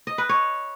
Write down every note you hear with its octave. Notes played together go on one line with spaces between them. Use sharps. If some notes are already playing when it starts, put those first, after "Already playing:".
D#5
B4
C#5